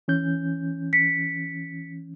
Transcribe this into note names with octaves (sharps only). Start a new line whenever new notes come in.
E3 C#4 G6
B6 C#7